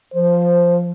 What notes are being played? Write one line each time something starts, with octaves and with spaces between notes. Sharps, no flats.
F3 C5